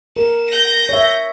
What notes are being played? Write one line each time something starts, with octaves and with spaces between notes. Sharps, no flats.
A#4 E7
G6 A#6
C#5 E5